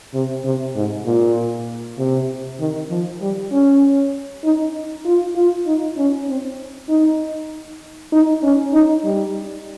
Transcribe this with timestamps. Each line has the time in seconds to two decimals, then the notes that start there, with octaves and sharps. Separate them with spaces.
0.14 C3
0.45 C3
0.75 G#2
1.06 A#2
1.99 C3
2.60 D#3
2.90 F3
3.21 G3
3.52 C#4
4.44 D#4
5.05 F4
5.35 F4
5.67 D#4
5.97 C#4
6.28 C4
6.89 D#4
8.12 D#4
8.43 C#4
8.74 D#4
9.04 G3